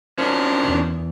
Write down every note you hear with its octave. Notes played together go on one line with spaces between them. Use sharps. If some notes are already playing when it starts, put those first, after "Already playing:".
F#2 D#3 F3 C#4 D4
E2